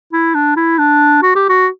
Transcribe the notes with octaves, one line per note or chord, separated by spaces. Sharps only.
E4
D4
E4
D4
F#4
G4
F#4